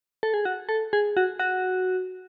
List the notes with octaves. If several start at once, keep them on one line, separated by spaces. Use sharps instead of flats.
A4
G#4
F#4
A4
G#4
F#4
F#4